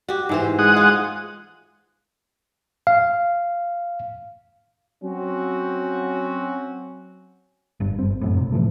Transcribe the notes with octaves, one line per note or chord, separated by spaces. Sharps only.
F#4 G4
G#2 E3 C5
G#3 F#5 D#6
F4
F5
F#3 C4 C#4 F#4
G1 G2
G1 C4
A1 F#2 A2
B1 C3
A2 E3 F3 A3